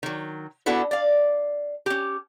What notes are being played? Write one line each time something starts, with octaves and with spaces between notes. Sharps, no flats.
D#3 F#3
B3 D4 E4 F#4 A4 B4
D5 F5
C#4 G4